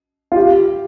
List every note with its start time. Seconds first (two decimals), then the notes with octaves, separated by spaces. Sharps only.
0.32 F4
0.36 G4